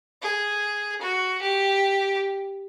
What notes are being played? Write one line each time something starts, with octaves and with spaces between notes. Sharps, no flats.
G#4
F#4
G4